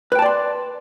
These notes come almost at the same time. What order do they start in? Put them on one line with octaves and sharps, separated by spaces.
B4 G5 A5 D5 C6